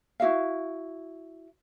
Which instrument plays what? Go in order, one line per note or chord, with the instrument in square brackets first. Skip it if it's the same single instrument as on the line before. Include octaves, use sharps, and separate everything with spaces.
[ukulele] E4 F#4 E5 F5